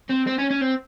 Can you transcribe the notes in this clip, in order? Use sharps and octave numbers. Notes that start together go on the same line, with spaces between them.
C4
C4
C#4
C#4
C4